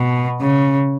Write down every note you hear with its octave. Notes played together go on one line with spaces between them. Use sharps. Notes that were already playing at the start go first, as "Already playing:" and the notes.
Already playing: B2
C#3